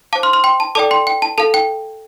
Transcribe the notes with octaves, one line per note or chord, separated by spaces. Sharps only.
C5 F5 A5 D6
C6 F6
C6 F6
G5 C6
A5
A4 D5 G5 A5 D6
G5 C6
G5
A5
A4 F5 A5
G5